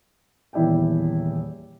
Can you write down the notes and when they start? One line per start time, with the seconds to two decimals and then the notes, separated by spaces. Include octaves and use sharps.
0.53 D#1 E2 E4 D5 G5